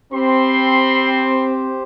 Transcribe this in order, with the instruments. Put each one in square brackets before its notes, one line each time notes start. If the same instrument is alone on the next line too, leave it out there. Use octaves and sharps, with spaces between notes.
[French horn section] C4 [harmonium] G4 C5 [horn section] B5 C6